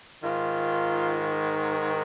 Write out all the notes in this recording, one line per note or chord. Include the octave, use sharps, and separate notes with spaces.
G#2 D#3 F4